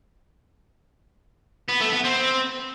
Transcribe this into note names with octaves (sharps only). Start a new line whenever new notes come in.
B3
A3
B3
C4